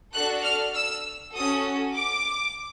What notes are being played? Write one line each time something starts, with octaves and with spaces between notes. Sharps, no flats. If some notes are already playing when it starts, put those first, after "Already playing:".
D4 F#4 A4 F#6
F6
E6
C#4 F#4 A4 D#6
D6